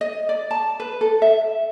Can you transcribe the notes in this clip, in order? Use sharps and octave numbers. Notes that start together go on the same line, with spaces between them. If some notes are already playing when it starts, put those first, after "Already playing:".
D#5
D5
A5
B4
A4
E5